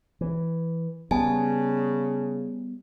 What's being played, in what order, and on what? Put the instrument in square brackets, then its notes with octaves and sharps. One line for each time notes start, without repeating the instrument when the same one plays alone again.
[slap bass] E3
[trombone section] C#3 [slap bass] G3 B3 [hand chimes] G#5 A5